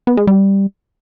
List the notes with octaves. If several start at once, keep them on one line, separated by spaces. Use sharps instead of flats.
B3
G#3
G3